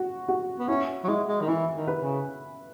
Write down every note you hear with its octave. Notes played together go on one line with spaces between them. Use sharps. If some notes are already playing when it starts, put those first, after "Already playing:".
Already playing: F#4
F#4
B3
C#4 E4
F#3
G#3 E4
G#3
D#3
E3 E4
D#3
B4
C#3